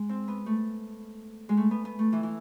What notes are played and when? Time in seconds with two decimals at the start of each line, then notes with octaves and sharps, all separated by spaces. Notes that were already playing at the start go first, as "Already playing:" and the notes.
Already playing: G#3
0.09 C4
0.28 B3
0.46 A3
1.49 G#3
1.57 A3
1.71 B3
1.85 B3
1.99 A3
2.12 E3
2.23 E3